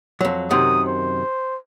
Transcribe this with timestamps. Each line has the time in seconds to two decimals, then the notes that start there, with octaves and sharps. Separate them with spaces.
0.21 F2 F#3
0.51 F#2 C3 D#3 D#6
0.88 C5